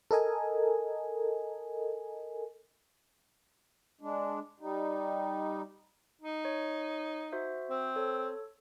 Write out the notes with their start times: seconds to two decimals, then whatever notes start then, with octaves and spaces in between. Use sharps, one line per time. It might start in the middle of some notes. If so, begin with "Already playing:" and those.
0.11 A4 A#4 D#5 G#5
4.01 G#3 D4
4.60 G3 D#4
6.22 D#4
6.45 C#5
7.32 F#4 C5 E5
7.70 C4
7.96 A4 C#5